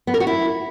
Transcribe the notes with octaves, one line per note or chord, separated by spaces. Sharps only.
B3
A#4
F#4
E4